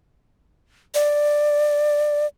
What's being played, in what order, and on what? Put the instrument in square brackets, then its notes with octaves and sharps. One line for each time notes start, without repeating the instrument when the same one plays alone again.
[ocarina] D5